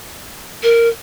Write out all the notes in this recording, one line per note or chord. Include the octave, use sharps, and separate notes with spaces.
A#4